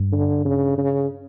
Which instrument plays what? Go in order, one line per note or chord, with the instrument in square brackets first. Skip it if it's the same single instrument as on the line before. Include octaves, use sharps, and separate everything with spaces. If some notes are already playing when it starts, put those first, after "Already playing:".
Already playing: [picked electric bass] G2
[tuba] D3
C#3
C#3